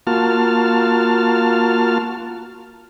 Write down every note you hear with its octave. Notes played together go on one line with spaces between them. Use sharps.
A#3 F4 F#4 A5 F6